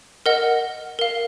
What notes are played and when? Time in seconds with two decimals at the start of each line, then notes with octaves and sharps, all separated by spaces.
0.26 A#4 D#5 F#5
0.99 A#4 F5